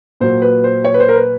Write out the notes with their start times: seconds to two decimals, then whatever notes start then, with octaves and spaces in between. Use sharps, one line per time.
0.20 A#2 F#3 C5
0.42 B4
0.64 C5
0.84 C#5
0.94 B4
1.00 C5
1.09 A#4
1.16 B4